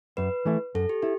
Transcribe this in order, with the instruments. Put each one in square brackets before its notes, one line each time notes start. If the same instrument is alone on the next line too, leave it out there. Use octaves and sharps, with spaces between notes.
[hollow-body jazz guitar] F#2 [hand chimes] B4
[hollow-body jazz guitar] E3 A3 E4
[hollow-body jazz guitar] F#2 [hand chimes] A4
[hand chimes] G4
[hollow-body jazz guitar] E4 [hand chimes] G4